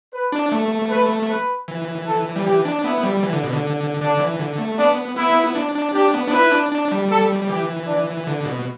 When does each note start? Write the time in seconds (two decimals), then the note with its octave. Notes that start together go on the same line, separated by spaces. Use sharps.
0.13 B4
0.32 D4
0.52 A3
0.91 B4
1.30 B4
1.68 E3
2.07 A4
2.36 G3
2.45 E3 G4
2.65 D4
2.84 B3 E4
3.03 G3
3.23 E3
3.33 D3
3.44 B2
3.53 D3
4.00 D3 D4
4.20 E3
4.39 D3
4.58 A3
4.78 B3 D4
5.16 B3 E4
5.44 E4
5.55 D4
5.75 D4
5.94 D4 G4
6.14 B3
6.28 D4
6.33 E4 B4
6.52 D4
6.72 D4
6.92 G3
7.11 A4
7.41 G3
7.49 E3 G4
7.87 D4
8.27 D3
8.45 B2